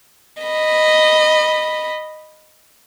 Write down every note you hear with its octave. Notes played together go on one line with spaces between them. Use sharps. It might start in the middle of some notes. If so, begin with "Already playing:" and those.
D#5 B5